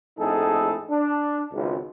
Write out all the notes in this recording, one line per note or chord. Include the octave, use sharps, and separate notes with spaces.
A#1 F2 A2 D#4 G#4 A4
D4
G#1 C#2